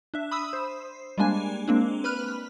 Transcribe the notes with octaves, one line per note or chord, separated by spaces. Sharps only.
D4 E5
B5 D#6 E6
C5
G3 G#3 A#3 D4 G#5
G#3 A#3 C4 D4
B4 B5 F6 F#6